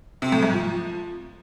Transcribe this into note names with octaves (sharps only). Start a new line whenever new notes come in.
C3
A2
G#2
F3